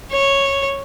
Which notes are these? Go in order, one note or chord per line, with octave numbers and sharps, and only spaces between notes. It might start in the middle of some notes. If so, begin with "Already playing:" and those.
C#5